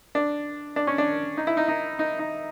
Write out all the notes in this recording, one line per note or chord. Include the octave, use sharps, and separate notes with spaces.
D4
D4
C#4
D4
D#4
E4
D#4
D#4
D#4
D#4